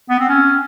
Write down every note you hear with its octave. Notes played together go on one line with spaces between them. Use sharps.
B3
C4
C#4